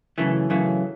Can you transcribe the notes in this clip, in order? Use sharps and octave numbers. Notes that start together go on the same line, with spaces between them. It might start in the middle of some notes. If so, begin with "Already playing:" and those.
F#2 C#3 E3 A3
F#2 C#3 E3 A3